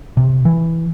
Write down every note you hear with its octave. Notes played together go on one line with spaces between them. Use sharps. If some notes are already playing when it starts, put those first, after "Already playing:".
C3
E3